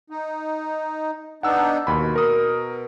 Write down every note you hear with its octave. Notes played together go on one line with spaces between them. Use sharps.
D#4
B3 D4 D#4 F#5 E6
D#2 B2 B5
A#4 D#6